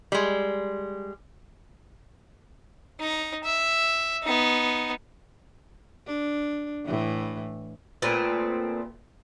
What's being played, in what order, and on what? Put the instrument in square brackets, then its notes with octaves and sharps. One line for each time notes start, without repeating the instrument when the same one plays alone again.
[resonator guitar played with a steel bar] G3 G#3
[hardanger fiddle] D#4 A#5
E5
B3 D#4
[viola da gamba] D4
A2 E3
[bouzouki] A#2 A3 B3 C4